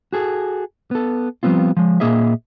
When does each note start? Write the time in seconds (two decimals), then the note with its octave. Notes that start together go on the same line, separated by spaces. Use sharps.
0.13 F#4 G#4 A4
0.91 B3 A4
1.43 F3 G3 B3 C4 F4
1.77 F3 G#3
2.00 A#2 A#3 G#4 D#5 E5